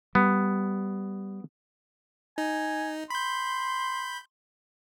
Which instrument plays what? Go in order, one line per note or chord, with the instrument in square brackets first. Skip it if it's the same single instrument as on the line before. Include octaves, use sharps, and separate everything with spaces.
[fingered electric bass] G3 [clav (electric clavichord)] B3
[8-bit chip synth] D#4 [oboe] G#5
[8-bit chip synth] B5 G6 [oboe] C6